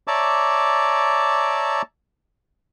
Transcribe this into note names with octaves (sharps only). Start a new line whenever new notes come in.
C#5 D5 E5 A5 A#5 D6